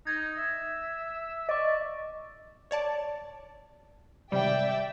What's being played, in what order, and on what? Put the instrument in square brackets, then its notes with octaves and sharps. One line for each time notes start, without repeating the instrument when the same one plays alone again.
[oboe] D#4 [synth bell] G#6
[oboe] E5
[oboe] D5 [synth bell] D#5 C#6
[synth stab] C#5 D5 A5
[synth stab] G#1 C3 G3 [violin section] D5 E5 G5